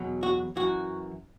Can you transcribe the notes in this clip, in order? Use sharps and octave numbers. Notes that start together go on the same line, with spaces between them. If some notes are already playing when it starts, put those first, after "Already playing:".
Already playing: E2 B2 F#3
F#4
F#2 E3 F#4